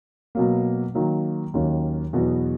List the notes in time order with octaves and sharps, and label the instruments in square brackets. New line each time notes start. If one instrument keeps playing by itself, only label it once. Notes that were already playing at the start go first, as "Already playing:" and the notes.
[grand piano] B2 F#3 A#3
D#3 F#3 A#3
D#2 D#3 F#3 A#3 C#4
E2 B2 F#3 B3 F#4